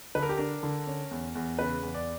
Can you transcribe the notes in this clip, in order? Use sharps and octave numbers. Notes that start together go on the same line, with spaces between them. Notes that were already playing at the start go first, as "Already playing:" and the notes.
D3 B4
A#4
G4
D4 A#4
D3
C#4
E2
E2
C#3 B4
E2
D5